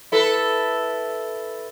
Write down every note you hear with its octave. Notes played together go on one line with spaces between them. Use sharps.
E4 A4 B4